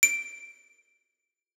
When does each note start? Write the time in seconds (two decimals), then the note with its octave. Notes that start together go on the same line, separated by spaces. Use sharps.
0.03 D7